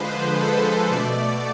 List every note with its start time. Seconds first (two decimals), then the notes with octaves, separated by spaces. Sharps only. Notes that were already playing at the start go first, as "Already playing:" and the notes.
Already playing: D3 F3 G#3 B4 C5
0.40 A4
0.91 B2 A3 D5